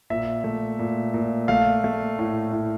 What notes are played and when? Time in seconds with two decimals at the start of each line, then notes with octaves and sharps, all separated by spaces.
0.10 A#2 E5
0.44 A3
0.79 A#2
1.14 A#2
1.48 A3 F5
1.84 A3
2.19 A2
2.53 A2